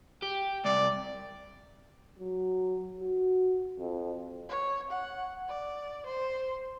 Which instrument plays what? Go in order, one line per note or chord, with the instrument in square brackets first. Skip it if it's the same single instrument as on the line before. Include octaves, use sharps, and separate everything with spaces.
[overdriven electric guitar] G4
[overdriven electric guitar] C2 [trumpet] D5
[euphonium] F#3
F#4
F2
[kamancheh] C#5
F#5
D5
C5